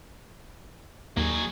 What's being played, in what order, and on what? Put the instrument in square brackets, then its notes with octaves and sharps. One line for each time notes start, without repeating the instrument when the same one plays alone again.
[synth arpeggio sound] D#2 [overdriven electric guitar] F#3 G#4